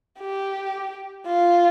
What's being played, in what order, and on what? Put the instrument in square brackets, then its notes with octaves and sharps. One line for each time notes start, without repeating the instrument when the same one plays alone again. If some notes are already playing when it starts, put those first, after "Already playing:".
[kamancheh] G4
F4